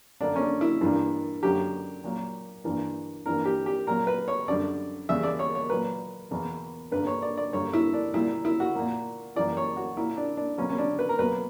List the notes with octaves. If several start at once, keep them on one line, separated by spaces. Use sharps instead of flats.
F#2 D3 A#3 D4
C#4
D4
E4
G2 E3 G3 A#3
F#2 D3 F#3 A#3 G4
A#2 F#3 A#3
G2 E3 A#3
G2 E3 A#3 A#4
G4
G4
A#2 F#3 A#3 A#4
B4
C#5
F#2 D3 G3 D5
E2 C#3 G3 E5
D5
C#5
C#5
A#2 F#3 A#3 B4
E2 B2 A#3
G2 D3 A#3 B4
C#5
D5
D5
G2 D3 G3 A#3 C#5
E4
D4
A#2 G3 A#3 E4
E4
F#4
A#2 A#3
F#2 E3 G3 A#3 D5
C#5
F#4
A#2 A#3 E4
D4
D4
B2 F#3 A#3 C#4
C#4
D4
B4
A#4
B2 F#3 A#3 B4